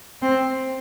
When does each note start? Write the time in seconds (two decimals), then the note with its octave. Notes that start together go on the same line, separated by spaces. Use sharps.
0.22 C4